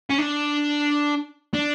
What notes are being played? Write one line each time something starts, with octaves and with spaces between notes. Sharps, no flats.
C#4
D4
D4